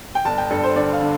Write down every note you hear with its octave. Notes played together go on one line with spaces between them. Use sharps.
G5
G1 A5
G5
G2 A4
C5
D3 D5
F5
D3